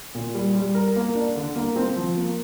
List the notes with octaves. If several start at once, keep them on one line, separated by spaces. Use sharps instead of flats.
A#2
G3
G3
A#4
A#3
D4
D3
A#3
C4
F3
A#3